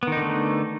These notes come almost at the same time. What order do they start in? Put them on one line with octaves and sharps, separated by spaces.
B3 D#3 D#4 D3 A3